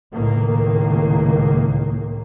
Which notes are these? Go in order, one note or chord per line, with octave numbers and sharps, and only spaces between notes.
C#2 A2 D#3 A#3